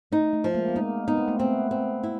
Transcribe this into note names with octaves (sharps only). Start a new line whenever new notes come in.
A3 D#4
A3
F3
G#3 A#3
B3
G#3 A#3 D#4
B3 D#4
C4
A3 B3
A3 B3 C4
C4
E4